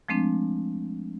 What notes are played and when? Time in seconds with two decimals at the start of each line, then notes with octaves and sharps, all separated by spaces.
0.08 F3 G#3 A3 C4 D4